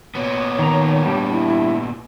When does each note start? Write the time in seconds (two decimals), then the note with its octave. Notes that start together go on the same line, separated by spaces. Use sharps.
0.15 A#2 B3 C#5
0.59 D#3 A#5
1.06 G3 D4
1.31 E4